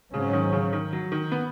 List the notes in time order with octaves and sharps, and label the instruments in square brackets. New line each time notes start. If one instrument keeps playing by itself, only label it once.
[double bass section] G#2 F#3 C#4 [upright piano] C#3
[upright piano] D#3
C#3
D#3
F#3
D#3
B3